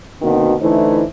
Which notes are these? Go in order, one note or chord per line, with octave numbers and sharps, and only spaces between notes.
B2 D3 D#3 A#3 C4 F#4
D3 E3 A3 D#4 E4 C5